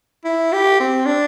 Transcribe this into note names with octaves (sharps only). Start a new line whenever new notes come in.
E4
G4
C4
D4